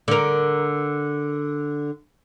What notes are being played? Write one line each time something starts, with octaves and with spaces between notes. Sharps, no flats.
D3 A#4